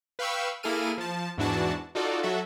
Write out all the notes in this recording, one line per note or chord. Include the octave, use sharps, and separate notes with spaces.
B4 F5 G5 B5 C#6 E6
A#3 E4 G#4 A4 F6 D#7
F3 A5
E2 G#2 E3 D4 F#4 A5
D#4 F4 F#4 A4 D5
F#3 F#4 A4 E5